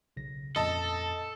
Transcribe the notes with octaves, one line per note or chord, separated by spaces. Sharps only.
B1 C#3 A#6
F2 A#2 C#4 A4 D#5 A5